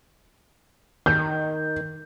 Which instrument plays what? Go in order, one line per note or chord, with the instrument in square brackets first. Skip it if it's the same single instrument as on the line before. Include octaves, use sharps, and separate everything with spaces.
[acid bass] D#3 [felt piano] G6